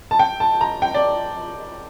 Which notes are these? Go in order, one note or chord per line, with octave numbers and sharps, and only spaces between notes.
A5
G5
A5
A#5
G5
D5